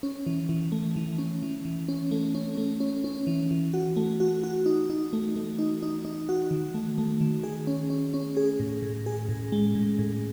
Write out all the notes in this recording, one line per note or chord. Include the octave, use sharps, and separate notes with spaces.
C#4
E3
E3
A3
E3
C#4
E3
E3
C#4
A3
C#4
A3
C#4
C#4
E3
E3
F#4
A3
F#4
F#4
D#4
D#4
A3
A3
D#4
D#4
D#4
F#4
D#3
A3
A3
D#3
G#4
C#4
C#4
C#4
G#4
A2
A2
G#4
A2
G#3
A2
A2